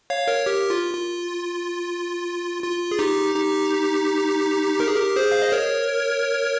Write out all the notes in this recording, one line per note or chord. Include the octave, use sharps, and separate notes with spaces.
C#5 F5
A#4 C#5
G4 A#4
F4
F4
F4
G#4
D#4 G4
D#4 G4
A#4
G#4
G4 A#4
G#4 C5
F5
D#5
A#4 C#5